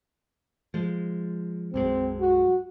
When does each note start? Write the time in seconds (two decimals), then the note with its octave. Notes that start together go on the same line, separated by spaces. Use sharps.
0.74 F3 G#3
1.74 B1 F#2 G#3 C4
2.20 F#4